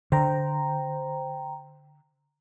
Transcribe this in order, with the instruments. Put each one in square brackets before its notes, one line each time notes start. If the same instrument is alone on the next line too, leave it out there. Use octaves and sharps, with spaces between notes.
[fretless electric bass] D3 [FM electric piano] C5 G5 A#5